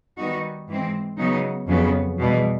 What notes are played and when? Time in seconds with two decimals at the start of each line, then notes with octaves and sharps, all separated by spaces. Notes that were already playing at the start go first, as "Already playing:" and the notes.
0.18 D#3 G3 B3 D#4 F#4
0.69 G#2 E3 G#3 C4
1.18 C#3 F#3 B3 D#4
1.68 F2 C#3 F#3 B3
2.18 E2 B2 G3